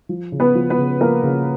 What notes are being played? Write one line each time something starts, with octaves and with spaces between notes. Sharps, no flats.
F3
C#3
B3 B4
F3
B3 B4
C#3
F3 A#3 A#4
C#3